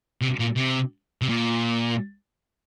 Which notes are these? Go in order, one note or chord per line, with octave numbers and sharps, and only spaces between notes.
C3
A#2
C3
C3
A#2